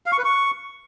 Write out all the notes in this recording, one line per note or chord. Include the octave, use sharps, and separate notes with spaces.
F5
C#6
B4
C#6